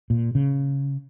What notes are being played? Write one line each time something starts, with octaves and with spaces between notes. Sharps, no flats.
A#2
C#3